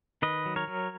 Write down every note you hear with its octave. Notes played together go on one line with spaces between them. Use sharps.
D#3 B4 D#5
F#3
A#4 C#5
F#3